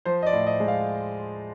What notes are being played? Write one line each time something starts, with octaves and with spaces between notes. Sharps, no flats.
F3 C5
D#5
D5
A2
D#5
G#3
F5